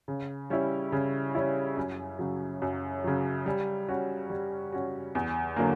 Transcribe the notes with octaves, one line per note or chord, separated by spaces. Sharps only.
C#3
G3 C#4 E4
C#3
G3 C#4 E4
F#2
C#3 F#3
F#2
C#3 F#3
G3
C#4 F#4
G3
C#4 F#4
E2
D3 F#3 A#3